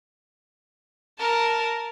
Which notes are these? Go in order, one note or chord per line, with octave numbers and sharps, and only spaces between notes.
A#4 A5